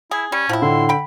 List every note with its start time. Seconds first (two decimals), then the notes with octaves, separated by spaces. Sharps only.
0.11 E4 G#4
0.32 G3 C#4
0.49 A2 F3 E4
0.62 A2 D3 C6
0.89 G5 B5